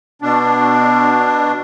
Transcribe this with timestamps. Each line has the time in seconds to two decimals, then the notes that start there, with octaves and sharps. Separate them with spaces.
0.22 B2 D4